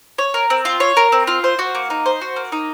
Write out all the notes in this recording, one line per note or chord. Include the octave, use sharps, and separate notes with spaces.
C#5
A#4
C4
F4
C#5
A#4
C4
F4
C5
F#4
A#3
D#4
C5
F#4
A#3
D#4